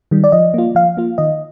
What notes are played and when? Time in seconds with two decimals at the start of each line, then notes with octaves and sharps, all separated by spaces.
0.11 D#3 G3
0.24 D5
0.32 F3 D#5
0.54 A#3 F4
0.75 F3 F5
0.97 A#3 F4
1.18 D#3 D#5